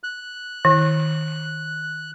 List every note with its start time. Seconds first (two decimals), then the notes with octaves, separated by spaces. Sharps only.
0.03 F#6
0.65 D#3